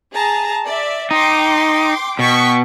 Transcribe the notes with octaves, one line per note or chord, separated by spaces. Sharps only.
G#4 A5 A#5
D5 E5
D#4 G5 C6 D6
B2 G5 C#6 B6